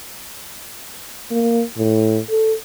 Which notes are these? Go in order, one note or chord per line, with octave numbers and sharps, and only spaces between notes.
A#3
A2
A4